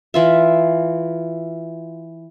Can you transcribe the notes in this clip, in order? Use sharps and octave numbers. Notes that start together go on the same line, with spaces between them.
E3 F4 E5